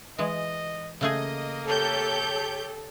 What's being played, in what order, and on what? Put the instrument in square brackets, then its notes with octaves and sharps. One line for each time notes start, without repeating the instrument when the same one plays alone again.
[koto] E3 G#3 [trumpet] D#5
[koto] C#3 A3 G#4 [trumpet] A#3 [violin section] D#5
[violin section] G4 C#5 G6 [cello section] A4